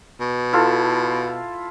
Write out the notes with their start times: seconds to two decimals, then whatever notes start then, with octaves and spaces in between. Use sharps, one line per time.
0.20 B2
0.53 E4 F4 A4